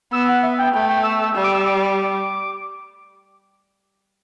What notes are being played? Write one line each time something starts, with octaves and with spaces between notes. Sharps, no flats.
B3 E6
F#5
E5
G5
A3 G5
G5
E6
E6
G3 E6
D6
E6
D6